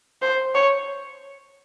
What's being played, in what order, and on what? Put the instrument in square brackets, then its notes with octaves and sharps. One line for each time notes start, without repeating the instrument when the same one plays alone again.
[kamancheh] C5
C#5